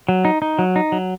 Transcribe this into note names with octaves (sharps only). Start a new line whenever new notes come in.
F#3
D#4
D#4
F#3
D#4
F#3